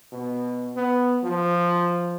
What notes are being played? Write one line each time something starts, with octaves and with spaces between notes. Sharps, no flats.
B2
B3
F3